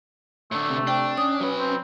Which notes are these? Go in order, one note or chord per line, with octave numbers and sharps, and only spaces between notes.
A2 D3 A3
C3
D4 G5
C#4 D#6
F#3 B4
C4